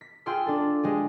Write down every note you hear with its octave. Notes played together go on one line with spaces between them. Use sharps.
B6
F4 G#4 G5 C6 E6
D4 A4
G#3 G4 G#4